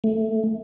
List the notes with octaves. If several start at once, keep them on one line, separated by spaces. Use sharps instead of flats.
A3